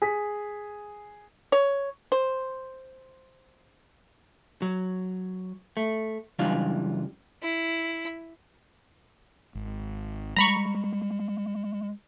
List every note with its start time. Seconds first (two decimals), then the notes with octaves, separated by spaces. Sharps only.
0.02 G#4 B6
1.52 C#5
2.12 C5
4.62 F#3
5.77 A3
6.39 C#2 F#2 E3 G3 D4 F4
7.42 E4
9.55 G#1
10.36 G3 G#3 A#5 B5 C#6